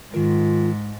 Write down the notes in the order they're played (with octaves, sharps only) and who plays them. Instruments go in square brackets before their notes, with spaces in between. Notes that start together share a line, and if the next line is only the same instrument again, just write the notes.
[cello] G#2 [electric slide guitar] D#3 A#4 [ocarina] F4